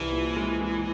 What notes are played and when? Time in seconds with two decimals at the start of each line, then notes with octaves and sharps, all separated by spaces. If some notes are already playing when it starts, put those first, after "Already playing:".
Already playing: C2 E3
0.11 A#2
0.36 G#3
0.61 G#3